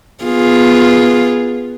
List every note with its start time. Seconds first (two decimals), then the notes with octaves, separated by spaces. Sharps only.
0.24 B3 F4 G#4